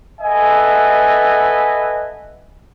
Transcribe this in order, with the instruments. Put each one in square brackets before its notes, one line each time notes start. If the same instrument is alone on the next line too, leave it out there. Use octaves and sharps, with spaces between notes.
[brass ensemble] A4 B4 D#5 E5 F#5 G#5